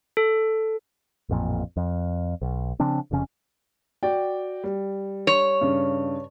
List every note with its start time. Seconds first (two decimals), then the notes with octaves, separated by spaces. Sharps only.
0.17 A4
1.29 A1 F2 A#2
1.77 F2
2.42 B1
2.80 C#3 F3 C4 D4
3.11 F1 F2 C#3 C#4
4.03 F#4 D5 G5
4.64 G3
5.27 C#5
5.61 G2 C#3